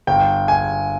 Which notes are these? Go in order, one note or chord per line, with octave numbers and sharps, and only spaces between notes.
G1 G5
G#5